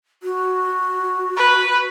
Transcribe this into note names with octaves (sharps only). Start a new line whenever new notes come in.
F#4
B4